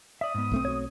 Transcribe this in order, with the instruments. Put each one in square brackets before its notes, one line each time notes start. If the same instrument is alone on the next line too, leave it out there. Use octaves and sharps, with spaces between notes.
[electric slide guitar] D5 E5 [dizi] D#6
[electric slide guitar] G#2 B3
[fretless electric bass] B1 A3 C4
[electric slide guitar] F#4 C#5